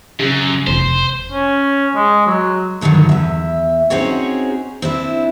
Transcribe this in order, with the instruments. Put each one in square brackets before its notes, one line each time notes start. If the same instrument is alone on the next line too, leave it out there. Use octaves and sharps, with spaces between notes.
[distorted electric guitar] F#2 [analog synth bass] C#3
[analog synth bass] F1 [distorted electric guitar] C5
[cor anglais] C#4
G#3
F#3
[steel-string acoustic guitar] G2 D3 D#3 F3 F#3
E2 E5
C4 C#4 D#4 F#4 G#4 C#5
C4 D4 E4